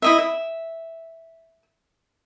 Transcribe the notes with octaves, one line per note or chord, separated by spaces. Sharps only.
E4 D#5 E5
E5